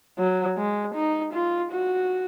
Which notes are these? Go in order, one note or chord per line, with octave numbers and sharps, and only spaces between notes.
F#3
G#3
D#4
F4
F#4